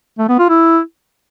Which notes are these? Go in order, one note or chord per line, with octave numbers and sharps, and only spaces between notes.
A3
B3
F4
E4